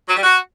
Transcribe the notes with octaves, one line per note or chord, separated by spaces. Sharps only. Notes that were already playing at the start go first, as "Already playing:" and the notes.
F#3
G3
F#4